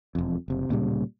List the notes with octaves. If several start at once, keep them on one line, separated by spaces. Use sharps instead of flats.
E1 F2
F#1 C3
D1 A#2 C#3 G3